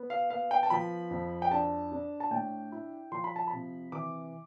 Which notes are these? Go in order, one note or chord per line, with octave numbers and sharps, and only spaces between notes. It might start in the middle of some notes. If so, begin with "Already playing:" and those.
Already playing: B3
F5
B3 F5
G5
A5
F3 B5
F2
G5
D4 A5
D4
A5
A2 G5
E4
F3 C6
B5
A5
C3 B5
E3 D6